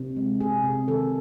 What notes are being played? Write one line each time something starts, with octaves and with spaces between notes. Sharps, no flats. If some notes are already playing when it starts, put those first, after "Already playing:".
Already playing: C3
G#3
C3 G#4
C3
D#3 A4